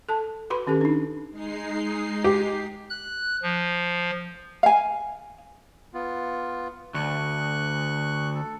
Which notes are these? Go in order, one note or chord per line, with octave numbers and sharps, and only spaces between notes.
A4 A5
F#4 B4 B5 C6
D#3 C#4 G4 A4
D4 D#4
G#3 D#4 C7
G4
F#6
F3
F5 G#5
B3 F4
D2 C#6 F#6
A4